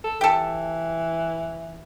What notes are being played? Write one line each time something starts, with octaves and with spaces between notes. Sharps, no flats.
A4
E3 G4 A4